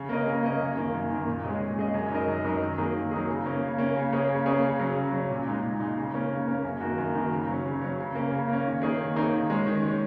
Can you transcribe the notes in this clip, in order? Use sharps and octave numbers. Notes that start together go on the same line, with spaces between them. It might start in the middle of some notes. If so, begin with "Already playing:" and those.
Already playing: C#3
A#3 C#4 A#4 D#5
C#3
A#3 C#4 A#4 D#5
F#2
D#3 A#3
F#2
D#3 A#3
A#2
G#3 C#4 G#4 D#5
A#2
G#3 C#4 G#4 D#5
F#2
F#3 D#4 A#4 D#5
F#2
F#3 D#4 A#4 D#5
D#3
F#3 A#3 D#4 G#4
D#3
F#3 A#3 D#4 G#4
C#3
A#3 C#4
C#3
A#3 C#4
C#3
A#3 C#4 G#4 C#5
C#3
A#3 C#4 G#4 C#5
C#3
F#3 C#4
C#3
F#3 C#4
A#2
G#3 D#4
A#2
G#3 D#4
C#3
A#3 C#4
C#3
A#3 C#4
F#2
D#3 A#3 D#4 F#4
F#2
D#3 A#3 D#4 F#4
C#3
F#3 C#4
C#3
F#3 C#4
C#3
A#3 C#4
C#3
A#3 C#4
D#3
A#3 D#4 G#4 C#5
D#3
A#3 D#4 G#4 C#5
D#3
G#3 C#4
D#3
G#3 C#4